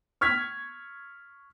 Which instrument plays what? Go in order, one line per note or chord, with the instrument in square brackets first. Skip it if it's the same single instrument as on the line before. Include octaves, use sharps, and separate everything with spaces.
[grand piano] C#6 F6 G#6 B6